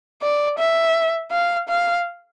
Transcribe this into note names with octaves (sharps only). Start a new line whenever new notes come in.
D5
E5
F5
F5